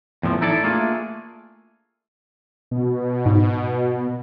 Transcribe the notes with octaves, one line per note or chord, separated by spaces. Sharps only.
E2 A2 D3 F3
D#4 E4 A4 D5
A3 A#3 D4 F4 G#4
B2
G#2